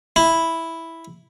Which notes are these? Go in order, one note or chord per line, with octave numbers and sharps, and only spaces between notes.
E4